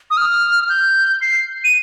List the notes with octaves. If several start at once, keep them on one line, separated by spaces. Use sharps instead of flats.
D#6
F6
G6
C7
D#7